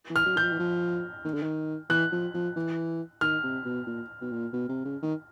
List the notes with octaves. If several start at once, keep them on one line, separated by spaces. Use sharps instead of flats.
E3
F6
F#3
E3 G6
F3
E3
F3
D#3
D3
D#3
E3 F#6
F3
F3
E3
D#3 F6
C3
B2
A#2
B2
A#2
B2
C3
C#3
D#3